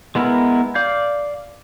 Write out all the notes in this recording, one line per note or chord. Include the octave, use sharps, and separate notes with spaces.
G#3 B3 E4 A#4
D5 F5 G6